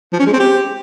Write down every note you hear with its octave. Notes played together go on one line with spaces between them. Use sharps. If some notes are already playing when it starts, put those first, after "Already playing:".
F3
C#4
G#3
C4
G4